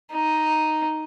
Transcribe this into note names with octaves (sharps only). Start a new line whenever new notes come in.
D#4